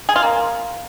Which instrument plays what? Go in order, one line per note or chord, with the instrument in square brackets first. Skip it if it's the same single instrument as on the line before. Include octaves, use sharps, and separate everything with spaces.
[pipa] G#4
F4
A#3